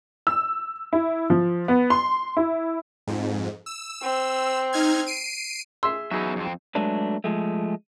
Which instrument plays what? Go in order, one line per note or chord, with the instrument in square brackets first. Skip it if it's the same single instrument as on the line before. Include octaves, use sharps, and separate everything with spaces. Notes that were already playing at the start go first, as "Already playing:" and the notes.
[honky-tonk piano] E6
E4
F3
B3
C6
E4
[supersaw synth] F2 G#2
E6
[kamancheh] C4
[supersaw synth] D#4 F6 G#6
C7 D7 D#7
[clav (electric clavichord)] G#4 E5 [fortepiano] C6 [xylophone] E6
[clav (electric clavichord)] F#3 D#4 G#4 [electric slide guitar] B3 C#4 E5
[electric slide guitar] F2 C4
F#3 G#3 A3 D4 B4
F3 G#3 A3